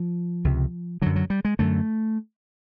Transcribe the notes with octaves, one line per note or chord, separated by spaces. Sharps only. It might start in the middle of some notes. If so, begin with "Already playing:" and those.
Already playing: F3
C#2 C3
F#2 D3 F#3
F#3
G3
G#3
F#2 D3 A3